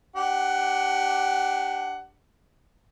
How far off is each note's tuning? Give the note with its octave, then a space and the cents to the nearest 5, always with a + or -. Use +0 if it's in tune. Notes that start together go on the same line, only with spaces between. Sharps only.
D4 +0 G4 -5 F#5 +15